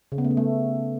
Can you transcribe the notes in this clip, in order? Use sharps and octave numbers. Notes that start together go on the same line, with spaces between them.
C#3
B3
A3
B3
A3